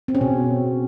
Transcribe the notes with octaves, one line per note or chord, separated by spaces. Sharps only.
C4
C#4
B2